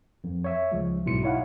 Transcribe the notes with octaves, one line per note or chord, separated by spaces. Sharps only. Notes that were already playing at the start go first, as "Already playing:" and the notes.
F2
C#5 E5
C#2 F3 G#3
B1 G#2 B2 E4 C6 C#7
D#4 E4 C#5 F5 F#5